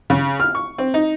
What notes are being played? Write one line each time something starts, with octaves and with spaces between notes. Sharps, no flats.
C#3
F6
C#6
C4
D#4